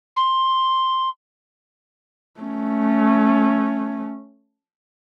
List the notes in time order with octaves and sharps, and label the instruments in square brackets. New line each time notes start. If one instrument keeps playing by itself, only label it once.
[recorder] C6
[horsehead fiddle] A3 C#4